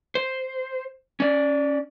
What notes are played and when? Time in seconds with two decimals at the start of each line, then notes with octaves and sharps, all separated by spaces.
0.15 C5
1.20 C#4 D5